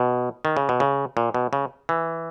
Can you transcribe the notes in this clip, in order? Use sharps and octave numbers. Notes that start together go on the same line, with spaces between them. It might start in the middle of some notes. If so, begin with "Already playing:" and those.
Already playing: B2
D#3
C#3
B2
C#3
A#2
B2
C#3
E3